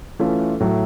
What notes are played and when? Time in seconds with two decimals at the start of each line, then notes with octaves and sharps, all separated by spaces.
0.19 E3 A3 C#4 F4
0.60 A2 F#3 A3